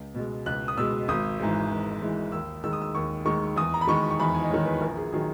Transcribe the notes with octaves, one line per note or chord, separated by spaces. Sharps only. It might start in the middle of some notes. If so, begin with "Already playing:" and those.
Already playing: C#2
B2 G#3
C#2 F#6
D#6
B2 G#3 E6
G#1 D#6
G#2 E3 G#3
G#1
G#2 E3 G#3
D#2 E6
D#3 G#3 E6
D#6
E6
D#2 C#6
D#3 G#3 C#6
E2 D#6
A#5
B5
D#3 G#3 C#6
C#6
E2 B5
G#5
D#5
D#3 G#3 C#5
B4
A#1 A#4
G#4
D#3 F#3 G#4